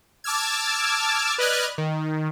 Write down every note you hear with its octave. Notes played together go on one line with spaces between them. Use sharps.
A5 D6 E6 F6 G#6
B4 D5 D#5 F6 F#6 G#6
D#3